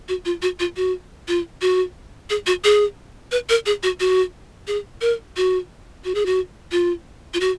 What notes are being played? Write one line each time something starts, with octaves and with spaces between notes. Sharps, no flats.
F#4
F4
F#4
F4
F#4
F4
F#4
G#4
F#4
G#4
B4
A#4
G#4
F#4
F#4
G#4
A#4
F#4
F#4
G#4
F#4
F4
F4
F#4